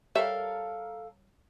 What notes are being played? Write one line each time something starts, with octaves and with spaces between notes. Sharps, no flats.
G3 A4 A#4 C#5 E5 F5